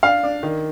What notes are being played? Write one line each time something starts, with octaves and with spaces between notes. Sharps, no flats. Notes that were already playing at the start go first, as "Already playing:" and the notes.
D4 F5
D4
D#3